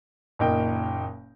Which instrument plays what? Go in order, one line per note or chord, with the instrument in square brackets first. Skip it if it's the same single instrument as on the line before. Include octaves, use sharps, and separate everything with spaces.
[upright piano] F#1 A#2 D#4 A#4 G5